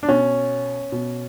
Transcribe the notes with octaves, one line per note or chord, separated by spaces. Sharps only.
D4
B2 C#4
B2